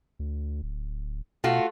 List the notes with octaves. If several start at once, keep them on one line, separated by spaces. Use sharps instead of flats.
D2
D1
B2 A3 F4 F#4